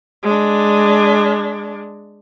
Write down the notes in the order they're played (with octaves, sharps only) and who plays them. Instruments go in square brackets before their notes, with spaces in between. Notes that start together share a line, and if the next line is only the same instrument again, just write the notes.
[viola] G#3 D4